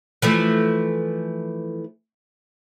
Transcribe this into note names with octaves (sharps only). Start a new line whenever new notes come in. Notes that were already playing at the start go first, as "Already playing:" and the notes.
E3 F3 A3